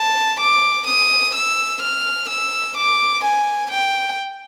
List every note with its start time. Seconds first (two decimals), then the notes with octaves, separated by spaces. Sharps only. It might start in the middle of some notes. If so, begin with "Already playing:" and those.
Already playing: A5
0.40 D6
0.87 D#6
1.35 E6
1.82 F6
2.29 E6
2.77 D6
3.24 G#5
3.71 G5